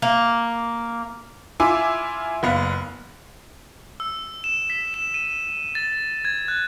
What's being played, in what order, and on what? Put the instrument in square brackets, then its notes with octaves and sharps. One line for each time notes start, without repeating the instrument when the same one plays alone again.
[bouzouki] A#3
[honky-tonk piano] E4 F4 G#5 D6 E6
F#1 B3 F5
[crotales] E6
E7
B6
E7
D#7
A6
G#6
F#6